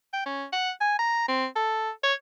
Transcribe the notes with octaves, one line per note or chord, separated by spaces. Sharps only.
G5
C#4
F#5
G#5
A#5
C4
A4
C#5